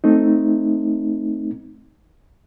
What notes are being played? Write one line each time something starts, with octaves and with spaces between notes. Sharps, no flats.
A3 C4 D#4